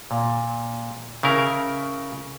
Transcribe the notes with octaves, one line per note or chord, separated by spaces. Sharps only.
A#2
C#3 E4 A#4